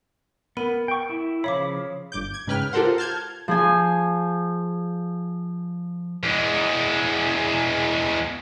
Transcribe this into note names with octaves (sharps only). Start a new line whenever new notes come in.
B3 A#4 B5 D#7
G5 C#6
E4
C#3 F3 C#5 F5 B5 D6
G1 D6 G6
G#6
G#2 C#3 B4 G5 F6
F4 G4 A4 A#4 C5 F#5
A5 F6 G6 G#6
F3 G#4 G#5
E2 G#3